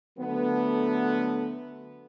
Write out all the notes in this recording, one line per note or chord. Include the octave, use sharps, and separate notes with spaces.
D3 F#3 A3 B3